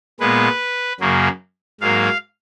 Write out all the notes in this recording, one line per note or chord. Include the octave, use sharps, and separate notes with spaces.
A#2 G#3 B3 B4
F#2 C#3 F#3 A#3
G#2 F#3 A#3 F5